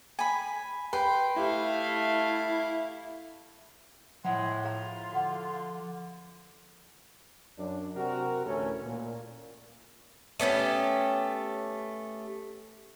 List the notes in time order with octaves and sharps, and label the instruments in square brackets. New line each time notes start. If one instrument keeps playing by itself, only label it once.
[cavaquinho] G#5 B5
[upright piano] B4 [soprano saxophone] G5 [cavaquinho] C6
[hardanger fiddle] A3 F5 [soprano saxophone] E4 [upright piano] G4
[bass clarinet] A2 [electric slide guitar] F3 E5 [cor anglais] G#3 [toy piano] F#5 A5 B5
[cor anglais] F4 [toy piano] G#4 F5 A#5
[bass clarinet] D3 [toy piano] F#4 F#5
[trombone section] F#2 D4
C3 F#4 A#4
D2 A2 E3 C#4 A4
A#2
[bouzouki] A3 B3 C#4 G4